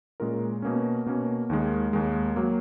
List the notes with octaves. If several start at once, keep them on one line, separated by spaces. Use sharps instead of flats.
A#2 G#3 C#4 F4 A#4
B2 A#3 C#4
B2 A#3 C#4
D#2 D#3 G#3
D#2 D#3 G#3
F#3 A#3